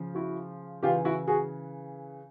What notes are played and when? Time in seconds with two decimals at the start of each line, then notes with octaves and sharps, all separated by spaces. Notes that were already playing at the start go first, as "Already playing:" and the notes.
Already playing: C#3 F3
0.15 E4 F#4
0.83 C#3 E3 F4 G4
1.05 E4 F#4
1.27 F#4 G#4